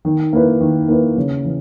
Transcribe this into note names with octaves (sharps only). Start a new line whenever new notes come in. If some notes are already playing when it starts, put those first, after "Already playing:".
D#3
A#3 E4 B4
D#3
A#3 E4 B4
C#3
E3